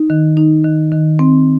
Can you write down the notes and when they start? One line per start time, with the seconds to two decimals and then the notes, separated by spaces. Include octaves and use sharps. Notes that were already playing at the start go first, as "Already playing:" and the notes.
Already playing: D#4
0.10 D#3
0.37 D#4
0.65 D#3
0.92 D#3
1.19 C4